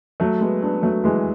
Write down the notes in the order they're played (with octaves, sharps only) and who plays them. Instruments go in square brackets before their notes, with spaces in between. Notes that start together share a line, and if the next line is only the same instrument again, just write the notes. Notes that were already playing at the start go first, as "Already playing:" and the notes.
[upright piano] F#3 A3
G#3 B3
B3 D4
F#3 A3
E3 G#3